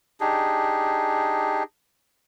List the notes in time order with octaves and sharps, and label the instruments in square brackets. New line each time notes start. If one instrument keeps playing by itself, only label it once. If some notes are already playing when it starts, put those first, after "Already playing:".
[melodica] D4 D#4 G4 G#4